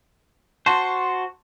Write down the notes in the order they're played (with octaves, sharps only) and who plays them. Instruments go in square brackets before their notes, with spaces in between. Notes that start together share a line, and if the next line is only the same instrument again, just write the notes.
[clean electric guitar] F#4 C5 [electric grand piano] A5 C6 C#6